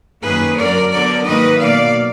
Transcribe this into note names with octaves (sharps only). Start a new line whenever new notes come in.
F#2 D#3 A#3 G#4 B4
F#2 D3 F#3 A#4 D5
D3 F#3 B3 A#4 D5
G#2 D#3 F#3 A#3 B4 D#5
B2 F#3 A#3 D5 F5